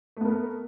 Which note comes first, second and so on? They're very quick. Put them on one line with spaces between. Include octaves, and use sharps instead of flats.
A3 B3 A#4